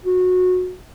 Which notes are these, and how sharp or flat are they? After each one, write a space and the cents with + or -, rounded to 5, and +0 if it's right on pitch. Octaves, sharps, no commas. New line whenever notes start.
F#4 -20